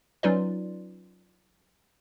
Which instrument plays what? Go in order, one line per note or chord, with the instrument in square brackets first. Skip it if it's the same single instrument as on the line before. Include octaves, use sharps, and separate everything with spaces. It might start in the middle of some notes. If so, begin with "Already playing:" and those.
[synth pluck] F#3 C#4 D#4 F4 B4 D5